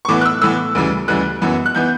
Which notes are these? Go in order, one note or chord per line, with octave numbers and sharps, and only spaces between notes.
C#6
A2 E3 B3 D6
F#6
E6
A2 E3 B3 E6
D2 C#3 E3 G3
D2 C#3 E3 G3 F#6
F#2 E3 B3
F#6
E3 B3 G6